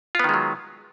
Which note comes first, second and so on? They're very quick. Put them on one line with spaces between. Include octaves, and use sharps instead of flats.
F4 B3 D#3 G#3 F#3